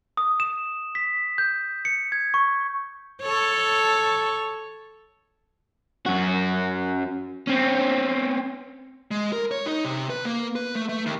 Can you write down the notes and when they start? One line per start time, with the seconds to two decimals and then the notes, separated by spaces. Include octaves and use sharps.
0.17 D#6
0.40 E7
0.95 B6
1.38 G6
1.85 C#7
2.12 G#6
2.34 C#6
3.22 A4 C#5
6.06 F#2 F#4
7.47 C4 C#4
9.11 G#3
9.33 A#4
9.51 C#5
9.66 D#4
9.85 C3
10.10 B4
10.25 A#3
10.56 B4
10.75 A3
10.89 A3
11.06 D#2